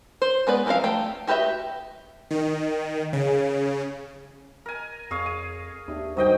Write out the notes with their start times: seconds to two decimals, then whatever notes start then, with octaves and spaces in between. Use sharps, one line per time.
0.22 C5
0.47 G#3 B3 B4 D5
0.66 E3 F3 C4 A#4 F5
0.84 A3 G5
1.27 F#4 G4 B4 D#5 E5
2.31 D#3
3.13 C#3
4.66 A#4 G#5
5.11 F2 G#4 C#5 F5
5.26 D#7
5.88 D#2 D4 G4 E5
6.17 G2 D#3 F#3 C5 D#5 G5